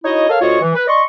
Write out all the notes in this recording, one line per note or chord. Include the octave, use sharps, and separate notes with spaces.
D#4 E4 F#4 C#5 D#5
A4 A#4 C#5 F5
D2 F4 F#4 C#5 D#5 C#6
E3
B4
D5 D#5 C6 C#6